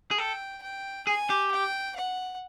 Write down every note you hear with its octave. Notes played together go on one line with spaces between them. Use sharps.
G#4
A4 G5
G5
G#4 G#5
G4
G5
F#5